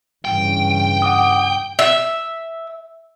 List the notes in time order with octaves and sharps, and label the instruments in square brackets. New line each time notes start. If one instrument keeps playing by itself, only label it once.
[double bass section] G2 C#3 E3 [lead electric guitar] G5
[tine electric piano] F#5 D6 D#6
[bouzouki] E5